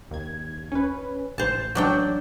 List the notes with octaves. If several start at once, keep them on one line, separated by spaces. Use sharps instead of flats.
D#2 G#6
C#4 B4
A1 C5 A5
F#3 D4 G5